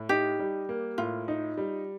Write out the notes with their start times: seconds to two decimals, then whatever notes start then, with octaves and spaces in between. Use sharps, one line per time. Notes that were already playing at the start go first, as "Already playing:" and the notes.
Already playing: A2
0.09 D#4 G4
0.39 G3
0.69 A#3
0.98 A2 F4
1.28 D#4
1.57 G3